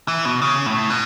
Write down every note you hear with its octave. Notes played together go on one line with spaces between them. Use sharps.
E3
B2
C#3
A2
B2